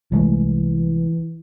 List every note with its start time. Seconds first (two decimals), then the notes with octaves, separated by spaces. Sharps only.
0.12 C2 E3 G#3 A3